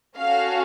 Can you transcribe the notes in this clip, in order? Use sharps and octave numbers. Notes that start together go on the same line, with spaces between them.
C#4 F#4 A4 F5